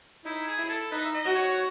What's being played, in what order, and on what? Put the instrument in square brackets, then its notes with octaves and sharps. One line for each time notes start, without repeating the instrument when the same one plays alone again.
[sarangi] D#4 [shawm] E4
[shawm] G#4
[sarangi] E4
[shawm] G#4
A4
[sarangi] D#4 [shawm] B4
[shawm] E5
D#5
[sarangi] F#4
[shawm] C#5